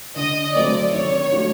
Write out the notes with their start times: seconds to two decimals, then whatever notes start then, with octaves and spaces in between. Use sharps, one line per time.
0.16 D3 D#5
0.55 F#3 A3 C4 D5
0.93 D#3 C#5
1.32 F#3 A3 D4 F#4